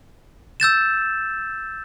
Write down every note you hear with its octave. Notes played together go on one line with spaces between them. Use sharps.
E6 G6 A6 E7